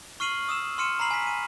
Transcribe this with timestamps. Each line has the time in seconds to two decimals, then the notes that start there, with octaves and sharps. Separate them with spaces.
0.20 C#6 F6 C7 D#7 F#7
0.49 D#6 E6 E7
0.78 C6 F6 C#7 D#7 E7
0.99 A#5 B5 C7 F#7
1.11 G#5 B6
1.27 D#7